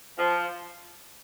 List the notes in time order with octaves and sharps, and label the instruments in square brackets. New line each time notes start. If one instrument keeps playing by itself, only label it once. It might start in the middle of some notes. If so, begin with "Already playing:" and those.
[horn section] F3